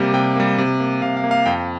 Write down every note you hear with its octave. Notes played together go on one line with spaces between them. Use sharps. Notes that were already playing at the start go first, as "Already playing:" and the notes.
Already playing: C3 G3 A#3 G4
C3 G5
G3 A#3
C3
A#3
C3 F5
F5
A#3
F5
F2 G5